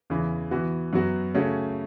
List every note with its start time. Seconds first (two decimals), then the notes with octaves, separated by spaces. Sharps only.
0.10 E2 C#3 E3
0.51 E3 B3 F#4
0.93 F#2 F#3 B3 F#4
1.35 C#3 A3 C#4 F#4